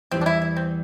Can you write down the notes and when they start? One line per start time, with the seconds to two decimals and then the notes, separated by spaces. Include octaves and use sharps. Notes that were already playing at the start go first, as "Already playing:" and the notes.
0.11 E2 E3 G3 C4
0.21 D4
0.26 E4
0.42 E4
0.56 C4